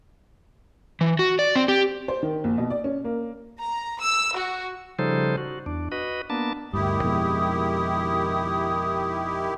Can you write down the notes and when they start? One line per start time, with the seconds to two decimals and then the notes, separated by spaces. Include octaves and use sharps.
1.01 E3
1.19 F#4
1.39 D5
1.56 C4
1.68 G4
2.08 C5
2.23 D#3
2.44 A#1
2.58 B2
2.70 D5
2.84 C#4
3.04 A#3
3.60 A#5
4.00 E6
4.36 F#4
4.99 C#3 F3 G3 D#4 A4 C5
5.38 F#4
5.66 E2 D4
5.92 F#4 B4 D#5
6.30 A#3 B3 D4 A5
6.73 D2 G2 D#3 E4 G4 D#6
7.01 F2 B2 G#3